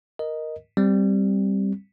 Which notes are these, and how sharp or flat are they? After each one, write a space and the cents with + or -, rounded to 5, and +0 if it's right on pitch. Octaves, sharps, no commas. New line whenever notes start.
A#4 +5 D#5 +0
G3 +0 C4 +5